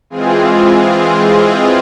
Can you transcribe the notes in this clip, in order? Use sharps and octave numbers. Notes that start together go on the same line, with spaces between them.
E3 G#3 C4 F4 G#4